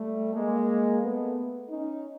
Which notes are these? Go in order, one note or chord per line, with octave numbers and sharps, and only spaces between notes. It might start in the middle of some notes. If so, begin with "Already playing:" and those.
Already playing: G3 A3
G#3 A#3
A3 B3
C#4 D#4